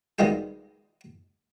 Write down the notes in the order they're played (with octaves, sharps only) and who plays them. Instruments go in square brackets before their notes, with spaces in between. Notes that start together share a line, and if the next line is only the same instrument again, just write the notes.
[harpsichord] B2 D#3 G3 G#3 F4 G4